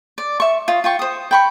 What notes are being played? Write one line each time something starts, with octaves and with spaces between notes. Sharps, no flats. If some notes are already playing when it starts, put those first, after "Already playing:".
D5
E5 C#6
F4 D#5
F4 G5 C#6
C5 D#6
G5 B5 C#6